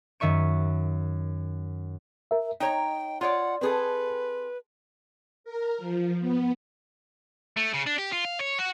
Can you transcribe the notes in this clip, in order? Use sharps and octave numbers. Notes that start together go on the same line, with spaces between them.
F#2 D#3 E5 C#6 D#7
A#4 E5
D#4 C#5 D#5 G5 A#5
F4 C#5 D5 F#5
C4 G#4 A4 B4
A#4
F3
B3
A3
C#3
D4
G4
F4
F5
C#5
F#4